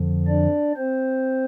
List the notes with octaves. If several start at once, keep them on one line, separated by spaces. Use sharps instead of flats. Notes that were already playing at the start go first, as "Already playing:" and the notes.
Already playing: F2 D3 F3
D4 D5
C4 C5